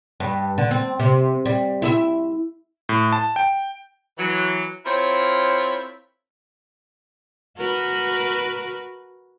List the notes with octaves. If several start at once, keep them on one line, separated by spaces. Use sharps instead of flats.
G2
D3
C4
C3
G3
E4 G#4 E5
A2
A5
G5
E3 F#3
C4 E4 F4 A#4 C5 C#5
F#4 A#4 B4